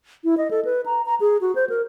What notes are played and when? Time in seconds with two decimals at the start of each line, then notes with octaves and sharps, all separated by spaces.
0.24 E4
0.37 D#5
0.51 A4
0.65 B4
0.86 A#5
1.06 A#5
1.20 G#4
1.41 F#4
1.55 C5
1.69 A#4